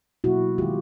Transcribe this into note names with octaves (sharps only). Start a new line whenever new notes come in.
B2 F#3 A#3 E4 F#4
D#3 G#3 F4 G4